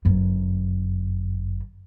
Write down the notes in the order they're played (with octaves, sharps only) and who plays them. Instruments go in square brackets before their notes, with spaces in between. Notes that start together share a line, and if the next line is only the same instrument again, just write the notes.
[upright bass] G1 F#2